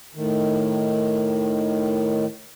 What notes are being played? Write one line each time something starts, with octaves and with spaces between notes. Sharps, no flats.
A2 D#3